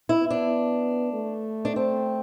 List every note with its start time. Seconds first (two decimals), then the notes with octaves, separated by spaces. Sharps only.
0.09 E4
0.20 B3
0.30 D4
1.13 A3
1.65 D4
1.76 C4